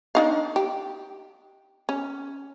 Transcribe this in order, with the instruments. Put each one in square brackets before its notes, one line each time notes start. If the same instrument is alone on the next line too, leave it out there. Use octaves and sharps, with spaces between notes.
[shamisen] D4 D#4 F5
G4
C#4